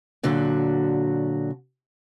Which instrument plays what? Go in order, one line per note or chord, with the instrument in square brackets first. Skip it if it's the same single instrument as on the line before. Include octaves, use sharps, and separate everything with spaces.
[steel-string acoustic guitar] A#2 D3 F#3 F#4